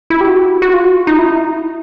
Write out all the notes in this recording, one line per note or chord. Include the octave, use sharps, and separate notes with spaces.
E4
G4
F#4
F#4
F4
F#4
F4
D#4
E4